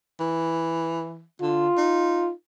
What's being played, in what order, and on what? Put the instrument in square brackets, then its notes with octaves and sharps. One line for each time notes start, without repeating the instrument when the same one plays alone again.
[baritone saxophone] E3
[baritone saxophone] D3 [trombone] F4
[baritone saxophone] D#4